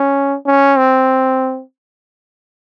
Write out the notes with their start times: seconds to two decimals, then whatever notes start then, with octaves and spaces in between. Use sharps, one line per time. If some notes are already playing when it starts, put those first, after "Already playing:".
Already playing: C#4
0.46 C#4
0.78 C4